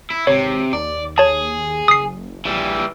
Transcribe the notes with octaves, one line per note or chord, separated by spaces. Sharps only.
E4
G#1 C3 C#5
D#2 D5
G#4 C#5 A5
F#1 D#6 C7
A#1 E3 G3